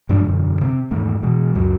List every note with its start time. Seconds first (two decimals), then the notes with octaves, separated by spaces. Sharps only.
0.09 G2 F3 G#3 D4
0.24 E1 F#2 D3
0.61 C3 B3 C4
0.91 E2 G#2 D#3 A3
1.23 B2 E3 G#3
1.55 C#2 F#2 F#3